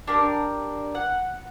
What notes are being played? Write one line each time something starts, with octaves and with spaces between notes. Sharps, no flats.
D4 G4 A#4
F#5